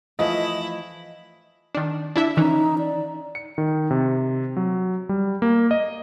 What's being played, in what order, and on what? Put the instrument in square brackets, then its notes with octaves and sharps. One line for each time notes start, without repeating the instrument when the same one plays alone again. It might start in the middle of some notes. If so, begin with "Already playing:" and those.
[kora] E3 F3 A3 [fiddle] E4 [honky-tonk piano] D#5
[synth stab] D#3 D4
D4 E4 E5
[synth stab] D#3 E3 C#4 [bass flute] D#4
[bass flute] D5
[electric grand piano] C#7
D#3
C3
F#3
G3
A#3
D#5